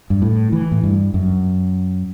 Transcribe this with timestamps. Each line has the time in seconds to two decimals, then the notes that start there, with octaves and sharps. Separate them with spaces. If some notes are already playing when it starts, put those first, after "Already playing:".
0.10 G2
0.22 A2
0.52 E3
0.72 A2
0.83 G2
1.14 F#2